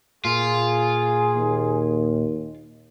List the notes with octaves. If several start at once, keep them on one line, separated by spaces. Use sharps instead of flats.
A#2 A#3 F4 G#4
D#2